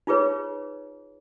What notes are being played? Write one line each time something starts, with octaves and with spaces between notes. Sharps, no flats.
D#4 F4 G#4 B4 C#5